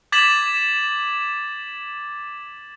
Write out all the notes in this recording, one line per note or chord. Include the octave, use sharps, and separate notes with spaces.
D6 G#6 A6 B6 E7 F#7